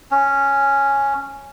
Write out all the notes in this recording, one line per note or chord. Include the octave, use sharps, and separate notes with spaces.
C#4